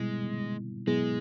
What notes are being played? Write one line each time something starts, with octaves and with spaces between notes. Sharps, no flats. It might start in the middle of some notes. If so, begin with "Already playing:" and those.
Already playing: B2 G3 G#3 B3 E4
B2 F#3 G#3 B3 E4 G#4